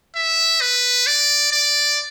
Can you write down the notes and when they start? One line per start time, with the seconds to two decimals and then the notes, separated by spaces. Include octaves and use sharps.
0.16 E5
0.61 B4
1.07 D5
1.52 D5